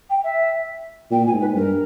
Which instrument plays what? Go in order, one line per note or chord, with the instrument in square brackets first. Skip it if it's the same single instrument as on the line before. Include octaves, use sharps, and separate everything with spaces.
[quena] G5
E5
[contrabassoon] A#2 [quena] G5
[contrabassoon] A#2 [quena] G#5
[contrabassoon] G#2
[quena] B4
[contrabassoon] G2 [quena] A#4